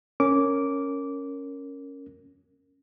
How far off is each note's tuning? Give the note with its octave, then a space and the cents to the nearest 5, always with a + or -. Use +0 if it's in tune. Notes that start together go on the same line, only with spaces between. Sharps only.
C#4 +0 A#4 -10 D6 -15